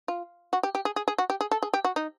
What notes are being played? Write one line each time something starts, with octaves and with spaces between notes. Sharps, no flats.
F4
F#4
G4
G4
G#4
G#4
G#4
F#4
G4
G#4
A4
G#4
G4
F#4
D#4